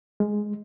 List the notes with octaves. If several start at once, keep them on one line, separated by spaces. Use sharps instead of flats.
G#3